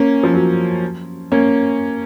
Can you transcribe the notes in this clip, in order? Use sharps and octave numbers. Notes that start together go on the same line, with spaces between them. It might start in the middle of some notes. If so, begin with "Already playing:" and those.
Already playing: A#3 C#4
F3
F#3
A#3 C#4